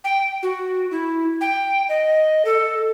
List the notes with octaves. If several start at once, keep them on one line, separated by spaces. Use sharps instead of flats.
G5
F#4
E4
G5
D#5
A4